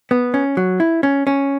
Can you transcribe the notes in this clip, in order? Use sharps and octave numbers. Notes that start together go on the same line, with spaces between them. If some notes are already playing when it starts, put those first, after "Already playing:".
B3
C#4
F#3
E4
C#4
C#4